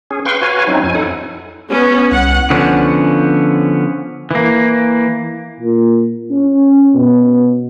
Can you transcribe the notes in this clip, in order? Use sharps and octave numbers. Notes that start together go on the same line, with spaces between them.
C#4 G#4
B4 F5 G5 C6 C#6
F#4 B4 C#5 F5 G#5
F#3 C4 C#4 D#4 E4
F2 G#5
D#4 E4 A4 F#5
B3 C#4
C2 F#5
D3 F3 B3 C#4
E3 A#3
A#2
C#4
B2